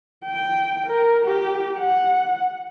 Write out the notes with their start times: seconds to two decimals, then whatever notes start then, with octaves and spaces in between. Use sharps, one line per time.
0.25 G5
0.87 A#4
1.25 G4
1.78 F#5